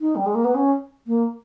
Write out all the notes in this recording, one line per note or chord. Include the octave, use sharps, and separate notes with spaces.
D#4
G3
G#3
A#3
B3
C#4
A#3